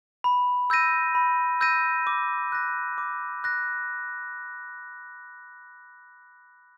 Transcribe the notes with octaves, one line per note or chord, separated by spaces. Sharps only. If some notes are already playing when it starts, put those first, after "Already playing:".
B5
E6 G6 A#6 D#7
B5
E6 G6 A#6 D#7
D6
F#6 A#6
D6
F#6 A#6